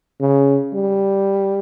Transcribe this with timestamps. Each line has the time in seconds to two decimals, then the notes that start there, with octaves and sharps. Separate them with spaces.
0.20 C#3
0.74 G3